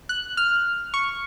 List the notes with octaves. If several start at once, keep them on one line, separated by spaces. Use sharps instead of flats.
F#6
F6
C#6